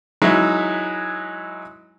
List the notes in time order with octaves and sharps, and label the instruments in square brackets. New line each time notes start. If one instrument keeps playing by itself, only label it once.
[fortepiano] E3 F#3 G#3 D#4 E4